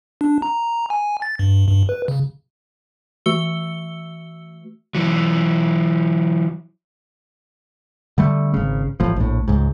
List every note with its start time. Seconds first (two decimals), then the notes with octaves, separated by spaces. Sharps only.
0.21 D4
0.42 A#5
0.90 G#5
1.22 A6
1.39 G2
1.68 G2
1.89 B4
2.08 C#3
3.26 E3 A3 F#4 E6 C#7 G7
4.95 E3 F#3
8.18 D3 G3 A3
8.54 G#1 C#3
9.00 A1 A2 F3
9.16 A#1 A2
9.48 C#2 G#2